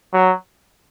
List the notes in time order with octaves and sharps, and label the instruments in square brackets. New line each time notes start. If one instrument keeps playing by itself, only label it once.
[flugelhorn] F#3